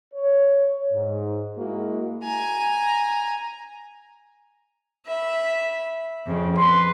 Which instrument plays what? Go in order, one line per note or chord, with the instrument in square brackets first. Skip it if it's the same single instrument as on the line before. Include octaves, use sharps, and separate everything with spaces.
[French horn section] C#5
G#2
G#3 A#3 E4 F#4
[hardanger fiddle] G#5 A#5
[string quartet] E5 B5
F2 C#3
[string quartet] B4 [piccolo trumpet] C6